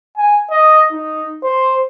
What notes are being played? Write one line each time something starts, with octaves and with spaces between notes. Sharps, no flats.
G#5
D#5
D#4
C5